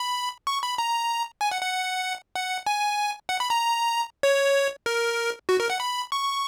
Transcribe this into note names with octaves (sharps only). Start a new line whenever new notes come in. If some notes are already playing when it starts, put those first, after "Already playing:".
Already playing: B5
C#6
B5
A#5
G#5
F#5
F#5
F#5
G#5
F#5
B5
A#5
C#5
A#4
F#4
A#4
F#5
B5
C#6